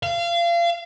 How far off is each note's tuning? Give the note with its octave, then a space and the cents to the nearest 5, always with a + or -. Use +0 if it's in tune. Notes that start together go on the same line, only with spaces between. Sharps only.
F5 -30